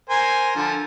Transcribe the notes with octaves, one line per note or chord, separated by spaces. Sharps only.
A#4 C5 G#5
D3 F3